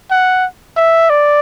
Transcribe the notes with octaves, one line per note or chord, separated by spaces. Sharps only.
F#5
E5
D5